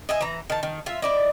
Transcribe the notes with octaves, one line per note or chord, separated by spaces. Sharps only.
D#5 E5 G#5
E3 A#5
D#3 A5
D#3
F4 E5
E4 D5 D#5